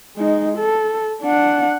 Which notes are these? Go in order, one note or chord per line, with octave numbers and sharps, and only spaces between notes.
G#3 D#4
A4
D4 F#5